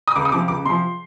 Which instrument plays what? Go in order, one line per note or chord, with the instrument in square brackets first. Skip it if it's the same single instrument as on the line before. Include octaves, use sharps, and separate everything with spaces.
[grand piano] D#6
C#2 D6
D#6
C3 F3 D6
C#2 D6
C3 F3 C6